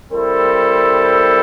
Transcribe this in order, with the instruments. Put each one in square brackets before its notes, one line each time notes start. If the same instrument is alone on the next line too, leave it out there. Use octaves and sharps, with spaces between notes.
[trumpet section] G3 C4 E4 A4 C5 [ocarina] A#4